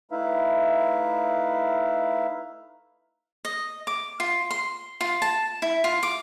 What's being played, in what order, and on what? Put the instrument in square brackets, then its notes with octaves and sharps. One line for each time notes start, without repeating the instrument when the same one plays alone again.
[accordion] A3 D#4 E4 B4 E5 F5
[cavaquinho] D#5
D6
F4
C6
F4
A5
E4
F4
D6